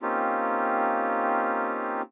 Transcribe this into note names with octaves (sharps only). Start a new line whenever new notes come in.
A#3 C4 C#4 D#4 F4 G4